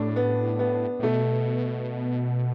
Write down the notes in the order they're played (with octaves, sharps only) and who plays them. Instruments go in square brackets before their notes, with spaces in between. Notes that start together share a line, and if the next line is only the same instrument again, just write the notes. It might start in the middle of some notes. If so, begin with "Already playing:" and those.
Already playing: [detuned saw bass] A2 [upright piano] D4
[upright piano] B3
B3
[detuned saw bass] A2
[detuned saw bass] B2 [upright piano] A3